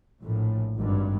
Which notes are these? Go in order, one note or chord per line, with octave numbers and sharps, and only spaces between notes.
A#1 A2
G#1 G2